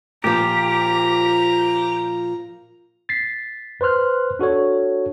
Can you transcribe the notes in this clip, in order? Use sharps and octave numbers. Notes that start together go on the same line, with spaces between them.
A#2 F3 G4 A#5
A6 B6 C7
B4 C5 C6 F6 F#6
D4 F#4 A4 C#5